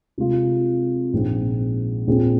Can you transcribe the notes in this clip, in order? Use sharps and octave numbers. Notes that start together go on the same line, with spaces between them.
C3 G#3 F4
A#1 G#2 G#3 C4
A#1 A#2 F3 C4 G#4